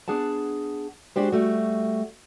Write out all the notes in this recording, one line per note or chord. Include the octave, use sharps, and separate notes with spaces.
B3 D4 G#4 F#5 A5
G#3 D4 F#4 G4 C5
G3 A3 F#4